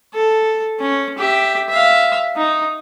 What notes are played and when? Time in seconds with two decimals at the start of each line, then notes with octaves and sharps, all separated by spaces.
0.14 A4
0.79 C#4
1.18 G4 E5
1.70 E5 F5
2.36 D#4